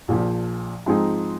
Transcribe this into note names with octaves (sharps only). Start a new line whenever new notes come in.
A#1 A#2 F3
G#2 F3 C4 D#4 G#4